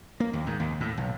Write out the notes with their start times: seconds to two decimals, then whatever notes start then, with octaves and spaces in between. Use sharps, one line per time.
0.20 A#3
0.33 D#2
0.47 G#2
0.60 D#2
0.80 A2
0.97 B1